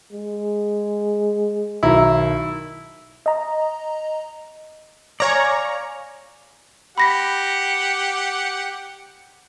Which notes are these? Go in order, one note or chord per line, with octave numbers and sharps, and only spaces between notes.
G#3
B1 D#3 E4 A#5
D#5 A#5
C#5 D5 F5 G#5 A#5
G4 F#5 B5 A#6 B6